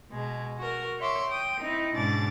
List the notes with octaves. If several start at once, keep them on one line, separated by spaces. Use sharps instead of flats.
B2 G#3
F#4 A#4
C#5 E5 C6 D6 E6
G5 D#6
C4 D#4 E4
G#2 B2 C#4 D4 D6 A6